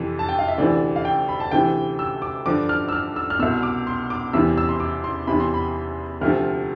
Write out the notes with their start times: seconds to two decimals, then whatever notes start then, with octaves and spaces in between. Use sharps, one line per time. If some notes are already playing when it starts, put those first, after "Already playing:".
Already playing: F2 C3 E3
0.19 A5
0.29 G5
0.39 F5
0.48 E5
0.58 D2 C3 E3 D5
0.96 F5
1.05 G5
1.28 B5
1.40 A5
1.51 D2 C3 E3 G5
1.99 E6
2.22 D6
2.46 G2 D3 F3 D6
2.69 F6
2.89 E6
2.92 F6
3.16 E6
3.30 F6
3.39 C2 B2 E6
3.63 D6
3.87 C6
4.10 D6
4.33 E2 C3 E3 E6
4.57 E6
4.69 C6
4.80 D6
5.04 C6
5.27 E2 C3 E3 B5
5.40 C6
5.54 B5
6.21 D2 C3 F3 F6